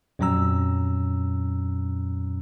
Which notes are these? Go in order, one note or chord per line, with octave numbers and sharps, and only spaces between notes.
F2 A#2 F#3 C#4 A#5 E6